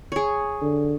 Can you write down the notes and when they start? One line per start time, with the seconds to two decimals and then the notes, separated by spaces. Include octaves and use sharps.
0.12 G#4 C#5
0.62 D3